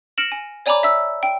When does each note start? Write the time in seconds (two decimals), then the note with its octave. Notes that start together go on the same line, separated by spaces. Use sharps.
0.18 F6 A#6 C#7 D7 E7 F#7
0.32 G#5
0.66 C#5 D5 G#5 A#5 B5 D6
0.83 E5 E6
1.23 G5